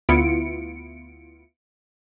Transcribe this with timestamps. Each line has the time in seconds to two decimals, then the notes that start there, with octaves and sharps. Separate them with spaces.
0.09 D2 B3 E4 F4 C#7 D7